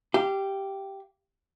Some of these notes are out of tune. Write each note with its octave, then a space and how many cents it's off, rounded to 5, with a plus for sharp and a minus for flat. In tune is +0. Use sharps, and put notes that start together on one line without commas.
G4 -5 F5 -25